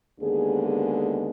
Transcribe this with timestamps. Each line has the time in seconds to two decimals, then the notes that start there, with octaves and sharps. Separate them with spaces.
0.19 D#2 D3 G#3 B3 G#4
0.66 G#4